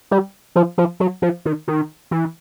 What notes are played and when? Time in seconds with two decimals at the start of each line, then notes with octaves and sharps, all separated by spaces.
0.11 G3
0.56 F3
0.78 F3
1.00 F#3
1.22 F3
1.45 D#3
1.68 D#3
2.11 E3